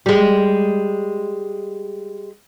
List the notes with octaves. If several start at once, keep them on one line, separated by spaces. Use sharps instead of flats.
G3 G#3